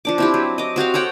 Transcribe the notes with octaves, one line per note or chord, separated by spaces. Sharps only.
F3 D4 D6
C4 E4 G4
F#3
D#5 D6
C4 F#4 G4 F5
A4 C#5 F#5 G5